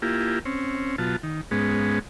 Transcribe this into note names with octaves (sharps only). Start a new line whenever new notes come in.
A#3 E4 F4 G4
C4 C#4
B2 F#3 F4 A5
D#3
G#2 G#3 B3 C#4